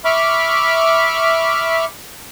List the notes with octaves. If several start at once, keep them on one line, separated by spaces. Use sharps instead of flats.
E5 B5 C#6 D6 F6